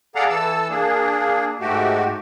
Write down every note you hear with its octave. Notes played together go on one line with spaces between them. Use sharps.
G#4 A4 D5 F5 F#5 A#5
E3 A4 A5 E6
A#3 D4 G#4
G#2 A3 F#4 G4